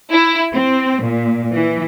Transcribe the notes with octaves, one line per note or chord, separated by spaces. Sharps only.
E4
C4
A#2
E3